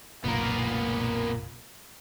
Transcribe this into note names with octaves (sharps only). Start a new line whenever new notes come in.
F#1 B1 A#2 A#3 B3 A#4